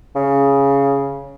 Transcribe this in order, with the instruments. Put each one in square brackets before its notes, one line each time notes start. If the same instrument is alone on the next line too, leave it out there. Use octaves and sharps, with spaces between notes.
[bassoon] C#3